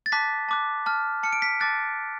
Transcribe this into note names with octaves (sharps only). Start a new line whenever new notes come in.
A6
A5 D6 F#6 B6
A5 D6 F#6
A5 F6
A5 F6 C#7
D7
B6
A5 D6 F#6 A6